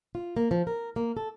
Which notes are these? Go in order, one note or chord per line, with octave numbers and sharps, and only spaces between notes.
F4
A#3
F3
A#4
A#3
A4